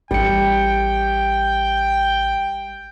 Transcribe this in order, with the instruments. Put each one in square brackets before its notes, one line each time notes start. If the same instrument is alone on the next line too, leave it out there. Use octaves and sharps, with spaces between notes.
[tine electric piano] A1 C#7 [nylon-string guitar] G3 [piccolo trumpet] G5